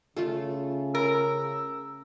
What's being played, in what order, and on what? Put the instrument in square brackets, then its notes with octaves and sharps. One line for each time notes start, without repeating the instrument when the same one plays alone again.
[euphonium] C#3 [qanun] A3 F4 A4
[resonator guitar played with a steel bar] A#4 [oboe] E6